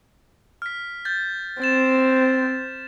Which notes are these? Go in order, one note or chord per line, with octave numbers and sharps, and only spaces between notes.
F6 B6
G6 A6
C4 A6 E7